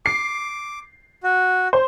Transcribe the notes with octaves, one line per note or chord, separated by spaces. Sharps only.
D6 C7
F#4
C5